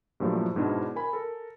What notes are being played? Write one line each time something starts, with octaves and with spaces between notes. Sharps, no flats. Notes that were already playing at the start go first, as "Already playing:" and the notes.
G2 A#2 F3 F#3 A3 E4
G#2 B2 D4 E4
A#4 G#5 B5
A4 A#4